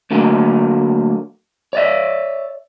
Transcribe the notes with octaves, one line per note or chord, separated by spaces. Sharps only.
D2 D3 F#3 A3 A#3
C#5 D5 E5